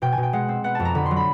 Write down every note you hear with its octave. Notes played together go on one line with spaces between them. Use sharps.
B2 G5
G#5
B2
G5
G#3 F#5
C4
B3 F#5
F2 A5
A#5
D3 B5
C6
F#3
B5